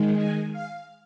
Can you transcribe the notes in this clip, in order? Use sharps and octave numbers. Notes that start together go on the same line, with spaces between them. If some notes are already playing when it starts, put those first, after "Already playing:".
Already playing: D#3 G#3
G#5
F5